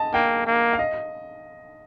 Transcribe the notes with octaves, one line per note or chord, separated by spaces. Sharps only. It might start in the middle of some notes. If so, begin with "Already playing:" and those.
Already playing: D#5 A5
A#3 G5
A#3
F5
D#5